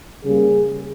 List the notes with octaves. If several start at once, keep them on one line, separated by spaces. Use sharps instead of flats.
C#3 G3 A#3 G#4